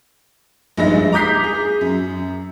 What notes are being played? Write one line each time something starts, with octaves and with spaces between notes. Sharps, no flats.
A#1 G2 G#3 D#4 E5 A#6
G#3
A#5 D6 D#6 G6 B6 C7
G#4
F#2